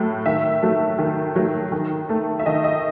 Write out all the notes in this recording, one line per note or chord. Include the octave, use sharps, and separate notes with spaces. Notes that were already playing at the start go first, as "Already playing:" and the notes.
Already playing: A2 F#3 A3
D#3 E5
F#3 A3
D#3
F#3 A3
D#3
A3
E5
D#3 D#5
D#5